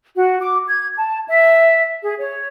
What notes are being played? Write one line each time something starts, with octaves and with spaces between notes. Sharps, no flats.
F#4
D6
G#6
A5
E5
G#4
C#5